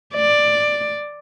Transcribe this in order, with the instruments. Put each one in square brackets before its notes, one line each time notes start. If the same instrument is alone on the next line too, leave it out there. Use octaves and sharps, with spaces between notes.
[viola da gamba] D5